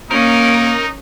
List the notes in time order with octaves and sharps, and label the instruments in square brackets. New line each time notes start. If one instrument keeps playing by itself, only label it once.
[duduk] A#3 [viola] C#4 [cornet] D#4 [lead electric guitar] A#4